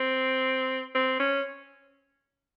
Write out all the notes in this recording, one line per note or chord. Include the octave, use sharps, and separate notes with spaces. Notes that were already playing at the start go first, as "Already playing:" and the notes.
Already playing: C4
C4
C#4